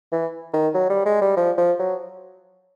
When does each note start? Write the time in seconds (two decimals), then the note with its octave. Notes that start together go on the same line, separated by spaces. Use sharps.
0.12 E3
0.53 D#3
0.74 F#3
0.90 G3
1.06 G#3
1.21 G3
1.37 F3
1.58 F3
1.79 F#3